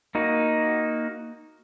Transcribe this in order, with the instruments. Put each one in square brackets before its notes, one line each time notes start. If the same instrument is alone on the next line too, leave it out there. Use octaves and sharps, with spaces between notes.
[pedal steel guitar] A#3 D#4 F#4